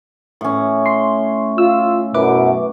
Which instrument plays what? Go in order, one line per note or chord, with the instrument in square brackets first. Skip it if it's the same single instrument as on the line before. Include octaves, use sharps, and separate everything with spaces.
[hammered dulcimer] A2 C#4
[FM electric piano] C6
[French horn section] F4 [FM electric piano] E6
[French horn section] F#2 B2 [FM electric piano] E4 B4 D6